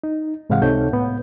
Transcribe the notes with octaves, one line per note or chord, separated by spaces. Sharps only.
D#4
G#2 C3 E3 G#3 F5 F#5
C#2 C3 D#4 A4 C#5 G6
A2 B3